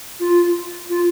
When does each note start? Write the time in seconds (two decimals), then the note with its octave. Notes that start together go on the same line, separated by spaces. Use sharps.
0.20 F4
0.89 F4